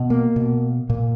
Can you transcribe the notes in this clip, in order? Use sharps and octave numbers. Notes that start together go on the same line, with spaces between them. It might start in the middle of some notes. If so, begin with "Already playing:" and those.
Already playing: B2
A#3
B2
A#2 A#3